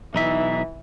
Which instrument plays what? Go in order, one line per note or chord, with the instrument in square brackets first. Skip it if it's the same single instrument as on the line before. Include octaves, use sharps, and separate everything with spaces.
[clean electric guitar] B1 D#4 E5 [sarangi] E3